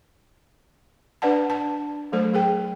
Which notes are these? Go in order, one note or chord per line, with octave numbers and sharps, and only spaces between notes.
D4 B4 D5 F#5 A5
A5
F#3 A3 A4 C5
G#4 A#4 G5